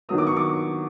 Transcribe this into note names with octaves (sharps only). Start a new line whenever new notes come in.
D#3 F#3 B3 D#6
D6
C#6
D6